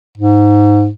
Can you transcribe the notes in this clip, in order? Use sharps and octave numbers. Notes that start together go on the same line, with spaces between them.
G#2